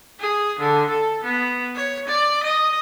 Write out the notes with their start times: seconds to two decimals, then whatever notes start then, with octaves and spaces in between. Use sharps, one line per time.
0.20 G#4
0.59 D3
0.90 A4
1.24 B3
1.75 C#5
2.07 D5
2.43 D#5